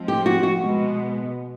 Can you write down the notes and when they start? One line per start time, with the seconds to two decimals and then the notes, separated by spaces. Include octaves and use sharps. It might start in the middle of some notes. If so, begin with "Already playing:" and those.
Already playing: F3 G#3 C4
0.08 G4
0.26 F#4
0.43 F#4
0.62 B2 G#3 B3